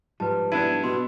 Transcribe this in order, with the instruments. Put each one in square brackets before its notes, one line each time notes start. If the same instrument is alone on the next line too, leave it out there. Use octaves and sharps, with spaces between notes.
[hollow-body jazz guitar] G#2 F3 G3 [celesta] B4 A5
[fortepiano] B3 D4 E4 [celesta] A5 G#6 D#7
[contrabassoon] B2 [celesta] C6